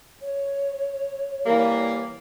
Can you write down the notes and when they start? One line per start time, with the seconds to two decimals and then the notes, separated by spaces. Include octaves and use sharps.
0.22 C#5
1.46 E3 G3 A#3